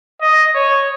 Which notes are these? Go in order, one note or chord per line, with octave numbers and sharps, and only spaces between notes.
D#5
C#5